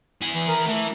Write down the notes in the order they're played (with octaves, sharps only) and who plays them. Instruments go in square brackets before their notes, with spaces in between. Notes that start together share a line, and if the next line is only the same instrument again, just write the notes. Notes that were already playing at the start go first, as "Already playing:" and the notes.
[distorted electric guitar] E4 G#4
[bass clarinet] E3
A#4
[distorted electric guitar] E3 [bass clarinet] A3